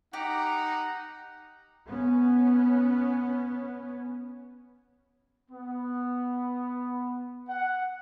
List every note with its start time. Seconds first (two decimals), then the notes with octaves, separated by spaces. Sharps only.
0.13 D#4 G4 F#5 A#5
1.85 B3 C#4
5.51 B3
7.48 F#5